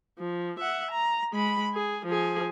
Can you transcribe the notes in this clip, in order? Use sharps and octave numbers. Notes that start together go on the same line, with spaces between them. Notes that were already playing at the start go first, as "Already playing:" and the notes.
F3
E5 F#5
A#5
G#3 B5
G#4
F3 G#4